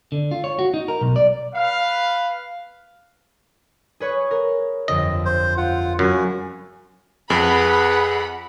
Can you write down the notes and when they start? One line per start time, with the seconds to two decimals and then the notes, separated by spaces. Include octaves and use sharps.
0.12 D3
0.31 F4
0.44 C#5
0.59 F#4
0.74 D#4
0.88 A#4
1.01 B1
1.16 D5
1.55 B4 F5
4.00 G#4 B4 C#5
4.31 A#4
4.88 G1 F2 D#5
5.25 C5
5.57 F4 F#5
5.99 F#2 F#3 F#4 G#5
7.30 F2 G#4 B4 F#5 B5